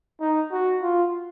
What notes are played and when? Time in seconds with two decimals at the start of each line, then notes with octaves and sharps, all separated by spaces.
0.20 D#4
0.51 F#4
0.82 F4